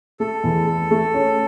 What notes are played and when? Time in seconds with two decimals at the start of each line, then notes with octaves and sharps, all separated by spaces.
0.20 A3 A4
0.43 E2
0.67 A3
0.91 A3
1.14 C#4